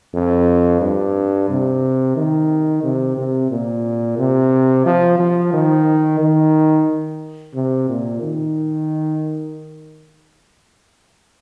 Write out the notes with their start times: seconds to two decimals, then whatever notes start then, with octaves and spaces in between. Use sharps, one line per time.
0.15 F2
0.81 G2
1.50 C3
2.16 D#3
2.83 C3
3.17 C3
3.51 A#2
4.18 C3
4.86 F3
5.19 F3
5.53 D#3
6.20 D#3
7.55 C3
7.89 A#2
8.22 D#3